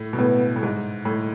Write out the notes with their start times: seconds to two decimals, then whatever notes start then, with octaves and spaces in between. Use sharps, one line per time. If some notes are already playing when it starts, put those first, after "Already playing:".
Already playing: A2
0.13 B2
0.18 A2 B3
0.56 A2
0.63 G#2
1.05 A2